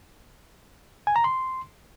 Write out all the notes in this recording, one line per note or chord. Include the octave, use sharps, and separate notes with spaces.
G#5
A#5
C6